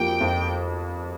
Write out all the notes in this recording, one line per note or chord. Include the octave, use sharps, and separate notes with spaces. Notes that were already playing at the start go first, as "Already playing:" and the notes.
Already playing: F2 F3 A#3 G4 G5
F2